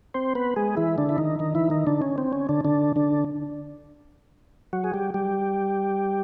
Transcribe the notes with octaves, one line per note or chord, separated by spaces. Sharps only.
C4 C5
B3 B4
G#3 G#4
E3 E4
D3 D4
E4
D#3 D#4
D#3 D#4
E3 E4
D#3 D#4
D3 D4
C#4
C4
C#4
D3 D4
D3 D4
D3 D4
F#3 F#4
G#4
G3 G4
G3 G4